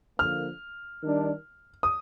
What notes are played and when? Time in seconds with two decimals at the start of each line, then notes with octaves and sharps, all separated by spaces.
0.18 D3 F3 A#3 F6
1.01 D#3 G3 D4
1.83 D#6